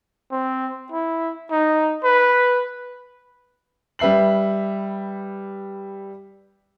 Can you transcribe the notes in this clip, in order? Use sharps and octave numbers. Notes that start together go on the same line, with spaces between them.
C4
E4
D#4
B4
G3 B4 E5 C7 F#7